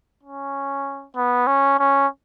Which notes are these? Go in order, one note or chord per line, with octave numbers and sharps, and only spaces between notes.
C#4
B3
C#4
C#4